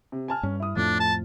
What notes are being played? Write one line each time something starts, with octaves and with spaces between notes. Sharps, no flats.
C3
G#5 A5 F6
G2 C#4
E4 D#6
F2 A2 F3 A3 D4
A5